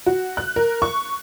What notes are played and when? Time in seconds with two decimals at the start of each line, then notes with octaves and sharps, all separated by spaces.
0.06 F#4
0.37 F#6
0.56 A#4
0.82 C#6